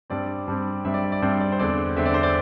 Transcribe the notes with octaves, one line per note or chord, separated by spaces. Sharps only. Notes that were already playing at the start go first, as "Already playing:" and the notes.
G2 G3 C4 D5
G2 G3 C4
G2 G3 C4 E5
D5
E5
D5
G2 G3 C4 C5
D5
C5
E2 D3 C4 D5
E2 D3 C4 E5
D5
C5
D5